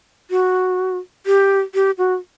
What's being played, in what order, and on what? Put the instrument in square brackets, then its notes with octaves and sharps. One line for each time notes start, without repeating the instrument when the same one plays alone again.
[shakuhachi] F#4
G4
G4
F#4